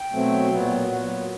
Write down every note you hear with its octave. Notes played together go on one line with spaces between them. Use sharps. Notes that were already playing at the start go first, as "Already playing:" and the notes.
Already playing: G5
B2 F#3 A3 C4
A#2 F#3 B3
A#2 F#3 B3